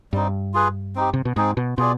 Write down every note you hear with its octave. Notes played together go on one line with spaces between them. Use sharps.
G2 G3 C4 D#4
F4 G#4 B4
C4 D#4 G4
C3
B2
G#2 C4 D#4 G#4
B2
B2 F4 G#4 D5